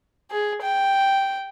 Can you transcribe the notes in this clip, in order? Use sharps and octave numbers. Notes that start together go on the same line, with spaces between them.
G#4
G5